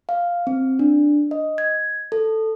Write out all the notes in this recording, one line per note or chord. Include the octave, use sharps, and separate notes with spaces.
F5
C4
D4
D#5
G#6
A4